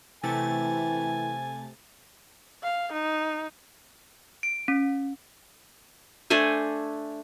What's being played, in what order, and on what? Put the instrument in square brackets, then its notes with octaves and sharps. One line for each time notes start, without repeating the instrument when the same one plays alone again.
[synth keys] C3 A3 A6 [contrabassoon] E3 [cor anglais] G#5
[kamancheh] F5
D#4
[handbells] D7
C#4
[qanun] A3 D4 C5 G#5